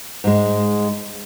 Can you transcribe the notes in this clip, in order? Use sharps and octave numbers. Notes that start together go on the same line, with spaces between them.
G#2 G#3